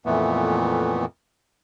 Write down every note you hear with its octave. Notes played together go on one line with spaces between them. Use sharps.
F2 A#2 E3 A3 B3